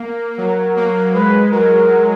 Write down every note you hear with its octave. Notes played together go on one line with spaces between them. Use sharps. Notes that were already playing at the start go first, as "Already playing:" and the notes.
Already playing: A#3
F#3 A#4
A#3
G#3 B4
F#3 A#4